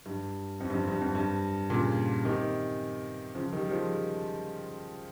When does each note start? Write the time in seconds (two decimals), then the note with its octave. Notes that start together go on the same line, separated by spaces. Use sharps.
0.06 G2
0.60 F2
0.70 G2
0.74 F2
0.88 G2
1.01 F2
1.15 G2
1.70 A#2 C#3
2.25 C3 D#3
3.35 C#3 F3
3.53 D#3 G3
3.65 G3
3.71 F3 G#3